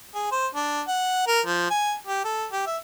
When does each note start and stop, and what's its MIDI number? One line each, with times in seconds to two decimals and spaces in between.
0.14 0.28 68
0.32 0.47 72
0.55 0.81 62
0.88 1.26 78
1.27 1.40 70
1.46 1.69 53
1.70 1.93 80
2.08 2.23 67
2.25 2.46 69
2.52 2.64 67
2.67 2.77 76